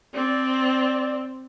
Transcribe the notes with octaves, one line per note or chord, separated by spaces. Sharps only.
C4 D5